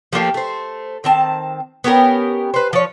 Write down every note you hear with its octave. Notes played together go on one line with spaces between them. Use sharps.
F3 A3 A#3 G4
A3 C5
D#3 C4 A5
B3 C#4 G4 A#4
B4 C5
F3 C#5